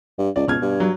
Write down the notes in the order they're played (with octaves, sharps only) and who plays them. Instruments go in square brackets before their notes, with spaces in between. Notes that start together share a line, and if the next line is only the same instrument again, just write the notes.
[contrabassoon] G2
[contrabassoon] C#2 [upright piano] D5
[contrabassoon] C#2 [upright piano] B2 F6 G#6
[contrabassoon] G2
[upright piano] F#3